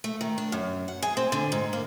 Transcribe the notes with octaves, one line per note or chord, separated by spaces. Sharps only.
A3
D#3
D4
F#2
F#5
G#4
C4
D3
G#2
A#3